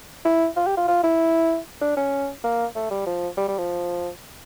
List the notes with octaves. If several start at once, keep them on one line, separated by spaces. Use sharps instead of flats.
E4
F4
G4
F4
F4
E4
D4
C#4
A#3
A3
G3
F3
G3
G3
F3